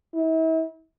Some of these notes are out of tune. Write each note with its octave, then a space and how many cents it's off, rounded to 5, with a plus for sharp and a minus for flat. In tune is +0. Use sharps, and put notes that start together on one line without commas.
E4 -40